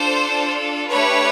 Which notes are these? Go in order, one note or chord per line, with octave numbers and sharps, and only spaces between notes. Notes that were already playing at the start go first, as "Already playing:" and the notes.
Already playing: D4 F4 A4 C5
A3 D4 G4 B4 C#5